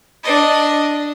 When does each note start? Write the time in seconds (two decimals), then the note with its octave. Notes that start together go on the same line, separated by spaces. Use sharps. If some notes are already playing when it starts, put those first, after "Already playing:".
0.24 D4 D#5